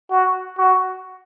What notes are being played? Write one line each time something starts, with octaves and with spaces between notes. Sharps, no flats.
F#4
F#4